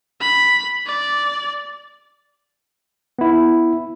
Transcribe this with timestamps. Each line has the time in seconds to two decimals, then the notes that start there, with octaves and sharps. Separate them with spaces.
0.21 B5
0.86 D5
3.19 B3 E4